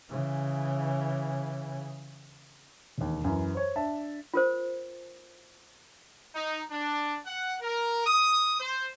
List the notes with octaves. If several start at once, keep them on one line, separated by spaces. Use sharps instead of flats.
C#3 E3
E1 D#2
F#2 E3
C5 C#5
D4 E5 A5
F4 A#4 C5
D#4
D4
F#5
A#4
D#6
C5